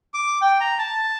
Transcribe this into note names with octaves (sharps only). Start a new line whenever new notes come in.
D6
G5
A#5
A5